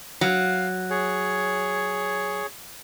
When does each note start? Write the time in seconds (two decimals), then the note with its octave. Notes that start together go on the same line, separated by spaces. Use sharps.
0.21 F#3 F5
0.90 G#4 C#5